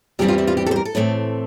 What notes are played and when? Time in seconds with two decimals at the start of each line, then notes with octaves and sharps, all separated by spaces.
0.19 E2 E3 G3 C4 G4
0.28 F4
0.38 E4
0.47 F4
0.57 G4
0.66 A4
0.71 C5
0.76 A#4
0.85 A4
0.95 A2 E3 A3 C4